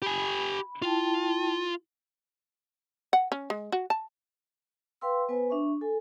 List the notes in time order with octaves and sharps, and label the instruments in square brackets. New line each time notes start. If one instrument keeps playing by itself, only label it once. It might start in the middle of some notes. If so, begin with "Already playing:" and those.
[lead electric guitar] G4 G#5 [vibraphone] B5
[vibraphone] E4 G5 A5 [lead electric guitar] F4
[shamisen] F#5
C#4
G#3
F#4
A5
[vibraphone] B4 F5 G5 C6 E6
B3 B4 C5 G#5
D4 E5 C#6
A4 G#5